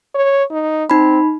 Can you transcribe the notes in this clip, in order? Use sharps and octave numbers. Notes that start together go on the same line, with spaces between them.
C#5
D#4
C4 D#4 B5